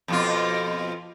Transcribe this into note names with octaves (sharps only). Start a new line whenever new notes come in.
F2 B2 F4